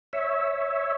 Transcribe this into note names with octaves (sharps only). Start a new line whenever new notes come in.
C#5 E5